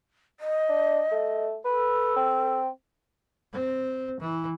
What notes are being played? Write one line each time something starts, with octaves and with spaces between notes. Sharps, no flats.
D#5
D4
A3
A4 B4
C4
C4
E3